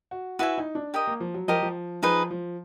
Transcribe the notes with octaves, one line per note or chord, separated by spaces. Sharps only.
F#4
E4 F#4 B4 E5 G#5
D#4
D4
G4 A#4 D#5
A#3
F3
F#3
F3 G4 A#4 D#5
F3
F3 D#4 G#4 B4
F3